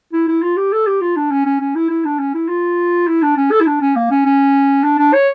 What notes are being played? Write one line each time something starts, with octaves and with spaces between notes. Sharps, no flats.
E4
E4
F4
G4
A4
G4
F4
D4
C#4
C#4
C#4
E4
E4
D4
C#4
E4
F4
E4
D4
C#4
A4
E4
D4
C#4
A#3
C#4
C#4
D4
D4
C#5